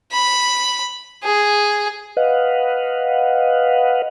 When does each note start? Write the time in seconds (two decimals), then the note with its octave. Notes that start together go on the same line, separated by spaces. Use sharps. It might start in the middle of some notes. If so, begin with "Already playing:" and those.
0.12 B5
1.23 G#4
2.17 B4 D#5 F5 F#5